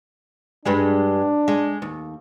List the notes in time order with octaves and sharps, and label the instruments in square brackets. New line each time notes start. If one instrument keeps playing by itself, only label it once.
[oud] G2 G3 G#3 [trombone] D4
[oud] G#3
D#2